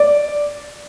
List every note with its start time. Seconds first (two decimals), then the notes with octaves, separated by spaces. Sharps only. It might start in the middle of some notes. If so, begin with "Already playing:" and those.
Already playing: D5